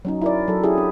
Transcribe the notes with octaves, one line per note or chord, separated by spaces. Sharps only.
F#3 C#4 D#4
E4 A#4 D5
F#3 A4
C#4 E4 G4 G#4
D4